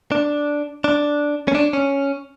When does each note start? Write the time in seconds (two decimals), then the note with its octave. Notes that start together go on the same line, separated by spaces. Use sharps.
0.12 D4
0.84 D4
1.48 C#4
1.55 D4
1.73 C#4